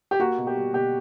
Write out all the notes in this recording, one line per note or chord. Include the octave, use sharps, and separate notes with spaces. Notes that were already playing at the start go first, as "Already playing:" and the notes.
G4
A#3 F#4
B2
G4
G3
B2 G4